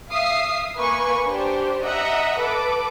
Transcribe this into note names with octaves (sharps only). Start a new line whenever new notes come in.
E5 F5 D#6 C7
A#3 B4 G#5 C#6
D4 G4 C5
D#5 E5 F#5 A#5
A4 B4 D6